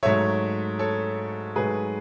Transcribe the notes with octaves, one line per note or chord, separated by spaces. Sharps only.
G#2 F#3 A3 C#5 E5
A4 C#5
G#2 F#3 A3 G#4 B4